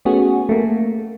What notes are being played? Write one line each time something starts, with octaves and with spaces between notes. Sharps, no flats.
A3 B3 C#4 F#4 G#4
A3 A#3